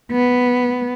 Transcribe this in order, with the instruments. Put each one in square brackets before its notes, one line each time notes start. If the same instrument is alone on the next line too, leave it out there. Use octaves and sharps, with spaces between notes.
[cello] B3